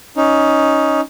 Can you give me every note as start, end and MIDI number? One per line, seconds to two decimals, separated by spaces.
0.17 1.01 61
0.17 1.01 63